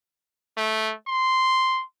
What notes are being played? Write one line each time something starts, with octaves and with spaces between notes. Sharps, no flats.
A3
C6